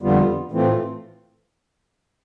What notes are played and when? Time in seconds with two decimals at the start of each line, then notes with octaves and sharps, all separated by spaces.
0.02 F2 D3 G3 B3 F4
0.51 A2 E3 A3 C4 F4